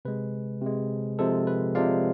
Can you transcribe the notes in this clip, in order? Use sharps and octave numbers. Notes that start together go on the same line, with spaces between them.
C3 G#3 B4
C3 G#3
C3 F3 G#3 A4
B4
C3 F3 G#3 D5 F5